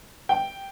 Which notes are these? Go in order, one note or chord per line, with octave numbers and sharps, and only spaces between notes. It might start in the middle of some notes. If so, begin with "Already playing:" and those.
G5